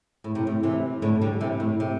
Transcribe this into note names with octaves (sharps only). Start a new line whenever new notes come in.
A2
C3
A2
C3 E3
A2 D3
D3 G3
C3 E3
A2
C3